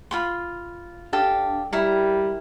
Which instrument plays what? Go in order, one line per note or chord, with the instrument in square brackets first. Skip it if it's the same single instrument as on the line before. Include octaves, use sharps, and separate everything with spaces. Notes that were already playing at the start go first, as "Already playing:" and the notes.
[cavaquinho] F4 B5 C6
[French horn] D4 [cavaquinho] G4 A4 F5
[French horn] G3 [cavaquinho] E4 A#4